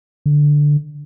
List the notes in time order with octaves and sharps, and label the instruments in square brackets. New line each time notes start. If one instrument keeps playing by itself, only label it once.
[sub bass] D3